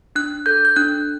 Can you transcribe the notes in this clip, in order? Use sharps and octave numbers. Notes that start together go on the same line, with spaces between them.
D4 F#6
A4 G6
G6
D4 F#6